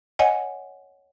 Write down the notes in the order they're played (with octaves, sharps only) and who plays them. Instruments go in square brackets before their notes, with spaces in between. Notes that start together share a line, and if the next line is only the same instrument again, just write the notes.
[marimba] C#5 D#5 F#5 G#5